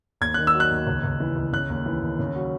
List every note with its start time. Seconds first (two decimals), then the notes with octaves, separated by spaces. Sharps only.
0.21 D#2 G#6
0.34 D#3 F#6
0.47 E6
0.54 F#3
0.60 F#6
0.71 D#2
0.87 C#2
1.03 C#2
1.20 E3
1.36 C#2
1.52 C#3 F#6
1.69 D#2
1.86 E3
2.02 D#2
2.19 C#3
2.35 F#3